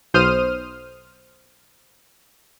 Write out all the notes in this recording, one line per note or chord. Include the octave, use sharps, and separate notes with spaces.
B1 C5 D#6 F6 D#7